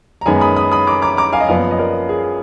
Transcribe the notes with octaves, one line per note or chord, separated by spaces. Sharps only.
A#5
F#2 D#3 G#3 B3 G#5 B5
B5 D#6
B5 D#6
B5 D#6
A#5 D6
A#5 D6
A#5 D6
F5 G#5
D#5
F#1 F#2 F3 B3 D5 F5
D#5
A#4 D5
G#4